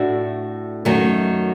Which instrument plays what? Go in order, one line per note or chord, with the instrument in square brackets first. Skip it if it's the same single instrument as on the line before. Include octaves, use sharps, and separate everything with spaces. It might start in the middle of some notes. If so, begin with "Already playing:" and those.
Already playing: [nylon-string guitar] A2 A3 D4 F#4
F#2 D#3 F#3 A3